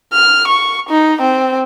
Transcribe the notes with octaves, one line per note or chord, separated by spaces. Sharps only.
F6
C#6
D#4
C4